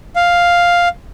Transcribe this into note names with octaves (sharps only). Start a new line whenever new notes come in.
F5